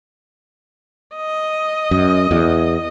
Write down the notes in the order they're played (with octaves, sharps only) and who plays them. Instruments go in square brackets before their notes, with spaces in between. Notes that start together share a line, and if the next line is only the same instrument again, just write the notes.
[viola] D#5
[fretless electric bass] F#2
E2